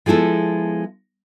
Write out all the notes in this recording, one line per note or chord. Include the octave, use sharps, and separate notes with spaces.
F3 G#3 B3 E4 A4